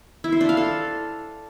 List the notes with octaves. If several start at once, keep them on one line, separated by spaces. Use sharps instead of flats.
E4
C5
D4
F5
A4